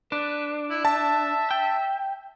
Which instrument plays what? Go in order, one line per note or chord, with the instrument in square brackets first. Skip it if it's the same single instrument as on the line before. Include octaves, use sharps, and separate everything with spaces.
[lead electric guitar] D4 [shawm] B4
[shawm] E4
[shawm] E5 [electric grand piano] A5
[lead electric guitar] G5